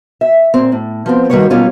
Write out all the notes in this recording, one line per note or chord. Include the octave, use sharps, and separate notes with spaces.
E5
A#2 C4
A2
F3 B3 C4
D#3 G3 A#3 F#4 B4 C#5
B2 F#3 G3 A#3 C#4 F4